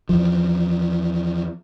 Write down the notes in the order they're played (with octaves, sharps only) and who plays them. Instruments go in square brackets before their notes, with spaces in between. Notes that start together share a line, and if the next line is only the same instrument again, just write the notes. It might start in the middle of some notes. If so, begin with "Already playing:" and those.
[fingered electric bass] E2 F3